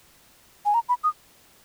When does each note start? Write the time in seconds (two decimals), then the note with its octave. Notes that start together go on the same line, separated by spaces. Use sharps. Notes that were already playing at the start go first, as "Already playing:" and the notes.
0.65 G#5
0.74 A#5
0.89 B5
1.03 D#6